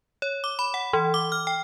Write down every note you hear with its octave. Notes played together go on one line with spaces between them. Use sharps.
C#5
D6
B5
F#5
E3
D6
F6
G5